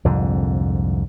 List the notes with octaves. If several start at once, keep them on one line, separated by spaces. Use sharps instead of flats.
C2 F2 G#2 D3